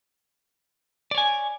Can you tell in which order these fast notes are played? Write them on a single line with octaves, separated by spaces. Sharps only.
D5 C#5 G#5